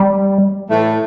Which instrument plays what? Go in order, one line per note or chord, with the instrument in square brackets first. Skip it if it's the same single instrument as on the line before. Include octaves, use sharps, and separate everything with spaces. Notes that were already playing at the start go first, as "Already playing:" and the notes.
Already playing: [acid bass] G3
[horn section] A2 E3 A3